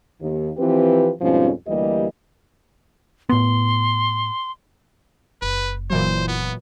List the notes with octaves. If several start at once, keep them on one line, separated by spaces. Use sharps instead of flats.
D#2
E3 F3 C4 G4 B4
F2 G#2 B2 F3 G3 C#4
D2 E3 G3 A#3 G4 D#5
A2 B3 C6
F#1 B4
A#2 E3 F#3 C5
B3